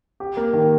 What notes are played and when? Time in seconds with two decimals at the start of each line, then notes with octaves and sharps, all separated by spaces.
0.20 G4
0.37 A#3
0.53 D#3